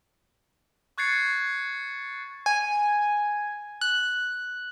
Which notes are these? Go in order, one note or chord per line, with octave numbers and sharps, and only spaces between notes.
C#6 F#6 G#6 A6 C7 C#7
G#5
F#6